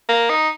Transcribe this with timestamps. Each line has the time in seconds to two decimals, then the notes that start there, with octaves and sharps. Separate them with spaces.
0.09 A#3
0.30 D#4